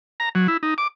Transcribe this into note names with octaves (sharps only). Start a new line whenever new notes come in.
A#5
F#3
E4
D#4
D6